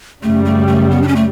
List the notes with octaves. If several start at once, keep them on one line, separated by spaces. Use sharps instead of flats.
F#2 C#3 G3 A3
A3
A3
B3
D4
C#4
A3